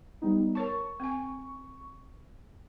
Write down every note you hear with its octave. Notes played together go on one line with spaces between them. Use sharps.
G3 B3 D#4
A#4 C#5 A5 C#6
C4 G#5